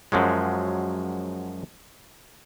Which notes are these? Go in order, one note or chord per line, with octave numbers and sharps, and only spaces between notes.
F#2 F3 F#3 G#3